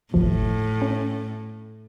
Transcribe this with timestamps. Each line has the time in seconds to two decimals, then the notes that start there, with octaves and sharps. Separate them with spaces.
0.14 G1 D#2 A2 F3
0.82 C#4